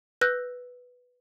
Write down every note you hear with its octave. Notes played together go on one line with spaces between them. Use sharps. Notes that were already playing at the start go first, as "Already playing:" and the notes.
B4 E6 F#6 G6 A#6